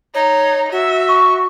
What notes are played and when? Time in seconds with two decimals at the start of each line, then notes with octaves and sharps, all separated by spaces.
0.14 D#4 C#5
0.72 F#4 E5
1.09 C#6